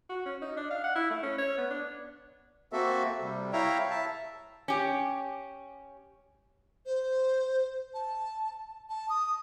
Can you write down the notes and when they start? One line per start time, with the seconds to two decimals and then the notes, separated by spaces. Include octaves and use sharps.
0.10 F#4
0.26 C#4
0.42 D#4
0.57 D4
0.71 F5
0.84 F#5
0.95 E4
1.10 A3
1.23 C#4
1.38 C#5
1.58 B3
1.70 D4
2.73 A#3 C4 F#4 A4 E5
3.22 C3 G3
3.53 E4 C#5 E5 F5 G5 A#5
3.90 E5 A5
4.68 C#4 G4
6.86 C5
7.94 A5
8.89 A5
9.09 D#6